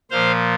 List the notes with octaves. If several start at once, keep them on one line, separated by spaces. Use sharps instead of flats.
A#2 F3 C5 F5